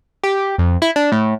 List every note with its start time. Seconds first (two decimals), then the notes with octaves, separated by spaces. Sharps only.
0.23 G4
0.58 F2
0.82 E4
0.96 D4
1.12 A2